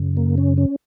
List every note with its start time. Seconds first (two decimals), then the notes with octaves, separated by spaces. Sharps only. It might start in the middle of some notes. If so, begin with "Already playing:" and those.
Already playing: F#2 C#3
0.17 A#3
0.38 C#4
0.58 C#4